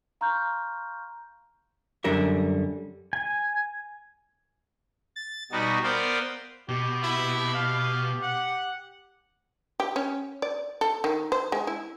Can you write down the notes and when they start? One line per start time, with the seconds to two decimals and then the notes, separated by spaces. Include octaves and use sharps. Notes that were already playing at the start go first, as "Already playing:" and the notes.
0.21 F5 A#5 C6 C#6 F6 G6
2.04 F#2 D3 G3 A#4 E5
3.13 G#5
5.16 A6
5.52 B2 G3 D#4 F#4
5.83 B3 A#4 C5 D5 F5 G5
6.69 B2 G4
7.04 E4
7.54 F5
8.23 F#5
9.80 G4
9.96 C#4
10.42 D5
10.81 A4
11.04 D#3
11.32 C5
11.52 G#3
11.67 E4